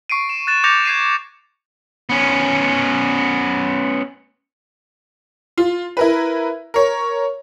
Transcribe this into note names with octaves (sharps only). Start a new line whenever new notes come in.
C#6 C7 D7 D#7
E7
F#6 A6 E7
D6 G6 A6 A#6 C#7 F7
G#6 C7 D#7
B3 C#4
F4
E4 A#4 B4
A#4 C#5